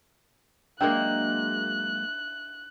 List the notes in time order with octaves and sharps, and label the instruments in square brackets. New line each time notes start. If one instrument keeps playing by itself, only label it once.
[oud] F#3 G#3 A#3 [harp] D4 E5 G5 [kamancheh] F#6